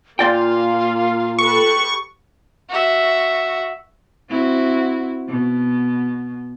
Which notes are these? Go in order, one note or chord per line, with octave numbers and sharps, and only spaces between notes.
A#2 A#3 F4 D5 F5 G5
G4 A4 B4 C#6
F#4 E5
C4 E4 F#4
B2